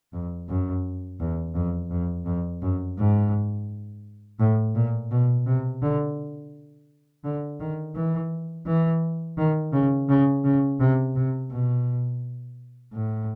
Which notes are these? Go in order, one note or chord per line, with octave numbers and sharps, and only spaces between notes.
F2
F#2
E2
F2
F2
F2
F#2
G#2
A2
A#2
B2
C3
D3
D3
D#3
E3
E3
D#3
C#3
C#3
C#3
C3
C3
B2
A2